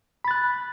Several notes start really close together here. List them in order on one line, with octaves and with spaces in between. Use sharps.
B5 A6 F#6